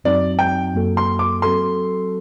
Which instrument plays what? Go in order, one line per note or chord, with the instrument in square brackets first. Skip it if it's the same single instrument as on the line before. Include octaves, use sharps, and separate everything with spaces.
[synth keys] F#2 F#3 C4 D#4 F#4 [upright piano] D5
[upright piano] G5
[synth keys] F#2 F#3 A#3 F#4 A4
[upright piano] C6
D6
[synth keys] F#3 C4 F#4 A4 [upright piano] C6